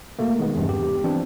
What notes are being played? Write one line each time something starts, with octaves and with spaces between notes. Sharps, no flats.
B2 A3 A#3
D#3 G#3 B3
E2 G2 C3
G4
E3 F3 B3 C4 D4